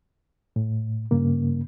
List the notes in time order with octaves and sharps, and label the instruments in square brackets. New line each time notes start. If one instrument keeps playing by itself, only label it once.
[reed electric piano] A2
G2 C#3 A#3